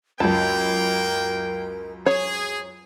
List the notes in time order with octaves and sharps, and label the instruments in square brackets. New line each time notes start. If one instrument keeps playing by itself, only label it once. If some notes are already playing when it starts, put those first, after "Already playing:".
[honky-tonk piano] C#2 F#2 [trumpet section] A#3 G5 [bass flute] A#4 [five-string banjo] A5
[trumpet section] G#4 [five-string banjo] C#5